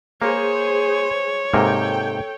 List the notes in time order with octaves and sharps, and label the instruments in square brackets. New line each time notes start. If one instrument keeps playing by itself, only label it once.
[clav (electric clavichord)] A#3 [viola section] G#4 C5 [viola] C#5
[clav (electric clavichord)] G#2 C3 A#3 [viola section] A4 G5